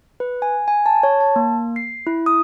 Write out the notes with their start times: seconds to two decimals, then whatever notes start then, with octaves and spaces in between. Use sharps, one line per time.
0.20 B4
0.42 G#5
0.68 G#5
0.86 A5
1.03 C#5
1.20 A5
1.36 A#3
1.76 C7
2.07 E4
2.26 D#6